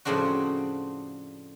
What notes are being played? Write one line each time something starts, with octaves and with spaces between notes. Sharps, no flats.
F2 A2 C#3 C4 D4 F#4